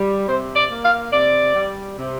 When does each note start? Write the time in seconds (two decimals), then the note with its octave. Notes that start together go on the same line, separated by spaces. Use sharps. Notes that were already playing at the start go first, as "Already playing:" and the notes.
Already playing: G3
0.27 C3 C5
0.56 D5
0.69 A#3
0.84 F5
1.12 C3 D5
1.55 G3
1.98 C3